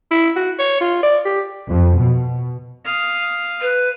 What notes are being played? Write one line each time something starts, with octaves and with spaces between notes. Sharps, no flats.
E4
F#4
C#5
F4
D5
G4
F2
B2
F5 D#6
B4